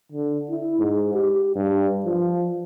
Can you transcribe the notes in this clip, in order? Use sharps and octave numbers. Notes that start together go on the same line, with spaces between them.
D3
E4
G#2
G4
G2
F3